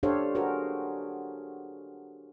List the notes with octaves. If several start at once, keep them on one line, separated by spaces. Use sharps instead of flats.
D4 G4 A4 C5 C#5 F5
F#4 G#4 A#4 C5